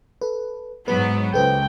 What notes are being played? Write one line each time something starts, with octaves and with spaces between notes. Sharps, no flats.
A4 B4
G#2 F#3 B3 B4
C#2 A4 B4 C5 G5